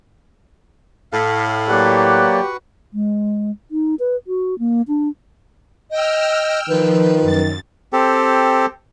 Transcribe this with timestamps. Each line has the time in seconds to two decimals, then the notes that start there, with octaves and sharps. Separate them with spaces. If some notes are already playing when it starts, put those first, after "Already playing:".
1.12 A2 F5
1.68 F#3 A#3 F#4 G4 B4 D5 F#5
2.93 G#3
3.71 D#4
3.99 B4
4.27 F#4
4.59 A#3
4.88 D4
5.91 D#5 G5 E6 F6
6.68 D#3 F3 B4
7.22 F#2 A6
7.93 C4 G4 A4